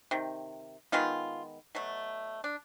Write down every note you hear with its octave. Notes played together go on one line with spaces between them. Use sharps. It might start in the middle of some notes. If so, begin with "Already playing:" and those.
C3 D#3
D#3 G#3 B3 F4
B2 F#3 A3
D4